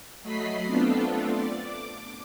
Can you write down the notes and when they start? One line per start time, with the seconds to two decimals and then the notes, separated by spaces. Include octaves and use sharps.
0.22 F#3 A3 D#5 B5 B6 C7
0.66 A3 B3 C4 D4 F4 A4
1.29 D5
1.63 D6